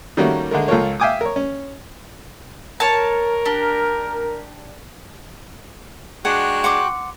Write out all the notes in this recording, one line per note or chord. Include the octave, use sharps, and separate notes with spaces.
D#3 G3 A3 A#3 C#4 F#4
D3 G#3 A3 A#4
C#2 F4 A4 A#4 C#5
E5 F5 G5 G#5 D6 D#6
A#4 C#5
C#4
A#4 C#5 A5
D4 G4
G#3 D4 F#4 F#5 G5 F#6
F#5 C6 D6